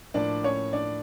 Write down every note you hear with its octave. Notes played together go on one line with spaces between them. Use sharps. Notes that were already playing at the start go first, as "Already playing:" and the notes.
A2 F3 A#3 D4 D5
C#4 C#5
D4 D5